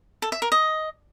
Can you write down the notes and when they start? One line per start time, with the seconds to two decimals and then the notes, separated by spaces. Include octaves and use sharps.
0.22 A4
0.32 E5
0.42 A#4
0.52 D#5